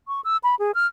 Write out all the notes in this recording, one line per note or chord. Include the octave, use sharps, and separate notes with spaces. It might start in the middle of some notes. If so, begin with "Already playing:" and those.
C#6
E6
B5
G#4
F6